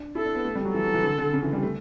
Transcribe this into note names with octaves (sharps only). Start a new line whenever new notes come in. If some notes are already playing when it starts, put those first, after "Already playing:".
Already playing: D4
E4 A4
D4
B3
A3
G3
F#3
E3 A4
F#3
E3
D3
D3
C#3
E3
G3
A3